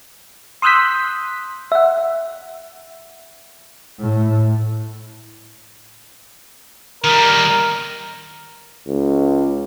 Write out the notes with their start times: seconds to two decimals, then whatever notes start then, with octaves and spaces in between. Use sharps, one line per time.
0.62 C6 D#6 E6 F#6 G6 B6
1.72 E5 F#5
4.00 A2
7.04 D#3 G3 A#4
8.87 C#2